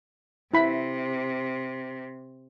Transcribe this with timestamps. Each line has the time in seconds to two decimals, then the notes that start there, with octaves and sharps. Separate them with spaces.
0.54 C3 E4 B5